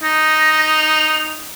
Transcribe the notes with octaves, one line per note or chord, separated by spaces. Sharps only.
D#4 A#6
F7